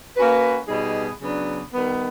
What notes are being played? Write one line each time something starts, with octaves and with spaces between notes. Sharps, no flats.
A#3 C#4 F#4 B4
B2 G3 B3 D#4 G#4
C#3 F#3 B3 D4
D#3 G3 B3